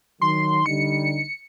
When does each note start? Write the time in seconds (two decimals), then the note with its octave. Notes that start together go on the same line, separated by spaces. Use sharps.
0.21 D#3 F#3 C6
0.66 D3 G3 D#4 C#7